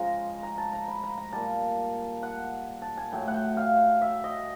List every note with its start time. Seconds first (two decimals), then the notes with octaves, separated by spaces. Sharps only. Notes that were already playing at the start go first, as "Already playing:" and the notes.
Already playing: C#3 F3 G#3 A#5
0.43 A#5
0.58 A5
0.73 A#5
0.88 B5
1.03 A#5
1.18 A#5
1.33 A#2 G3 A5
2.23 F#5
2.82 A5
2.97 G#5
3.12 A2 F#3 A3 G5
3.28 F#5
3.34 G5
3.57 F5
4.02 E5
4.24 D#5